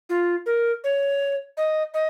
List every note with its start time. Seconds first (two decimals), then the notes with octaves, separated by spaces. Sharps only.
0.10 F4
0.46 A#4
0.84 C#5
1.57 D#5
1.94 D#5